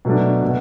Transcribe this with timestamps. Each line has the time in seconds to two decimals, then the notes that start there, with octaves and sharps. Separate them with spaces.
0.05 B2 F#3 A3 D4
0.43 B2 A3